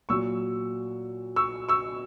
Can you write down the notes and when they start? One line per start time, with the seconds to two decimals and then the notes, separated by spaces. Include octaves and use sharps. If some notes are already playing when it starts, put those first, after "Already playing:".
0.09 A#2 F#3 C#6 E6
1.36 C#6 E6
1.69 C#6 E6